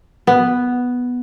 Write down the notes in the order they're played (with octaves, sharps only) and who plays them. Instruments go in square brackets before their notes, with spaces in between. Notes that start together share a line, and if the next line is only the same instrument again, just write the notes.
[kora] B3